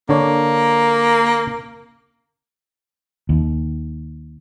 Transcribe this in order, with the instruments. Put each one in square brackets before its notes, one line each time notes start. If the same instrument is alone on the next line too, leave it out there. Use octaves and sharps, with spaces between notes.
[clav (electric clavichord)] D3 D4 C#5 [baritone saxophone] A#3
[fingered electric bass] D#2